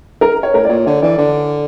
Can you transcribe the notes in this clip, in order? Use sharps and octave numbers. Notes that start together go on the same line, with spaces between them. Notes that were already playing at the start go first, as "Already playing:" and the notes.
A#4
C#5
A2 A#4
D5
A#2 C#5
D3 C#5
E3 D5
D3